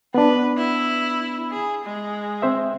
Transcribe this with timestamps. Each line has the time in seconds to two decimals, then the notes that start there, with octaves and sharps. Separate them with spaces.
0.14 B3 D4 B4
0.57 E4
1.51 G#4
1.85 G#3
2.42 C4 C5 E5